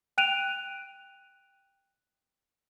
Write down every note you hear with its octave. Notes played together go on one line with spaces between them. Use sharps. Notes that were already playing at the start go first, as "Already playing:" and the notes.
G5 F#6 D7 D#7 F7